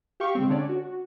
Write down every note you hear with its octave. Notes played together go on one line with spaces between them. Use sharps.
G4 F5 G5 C#6
C#3 G#3 C4
D3 C#4 D4 C#5 D5
F#4